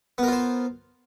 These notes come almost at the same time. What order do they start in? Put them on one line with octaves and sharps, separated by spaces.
B3 A#4 F4 C5